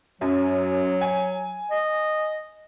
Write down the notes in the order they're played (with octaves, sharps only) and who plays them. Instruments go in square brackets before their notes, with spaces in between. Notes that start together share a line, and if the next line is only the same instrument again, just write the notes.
[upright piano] F#2 [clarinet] F#3
[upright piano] G#5
[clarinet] D#5